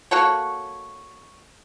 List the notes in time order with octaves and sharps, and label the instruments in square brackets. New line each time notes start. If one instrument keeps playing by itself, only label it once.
[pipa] A#3 F#4 A4 C#5